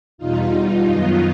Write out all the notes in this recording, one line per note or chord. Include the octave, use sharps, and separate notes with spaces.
E2 B2 G3 D#4 F4
F#2 D#3 F#3 B3 D#4 F4